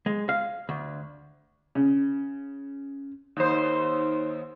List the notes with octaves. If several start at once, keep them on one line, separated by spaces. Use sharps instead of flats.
G#3
F5
D2
C#3
D#2 C5